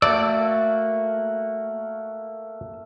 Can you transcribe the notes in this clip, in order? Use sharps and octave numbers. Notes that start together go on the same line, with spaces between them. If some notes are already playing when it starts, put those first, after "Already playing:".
A3 A#3 F#4 D5 E6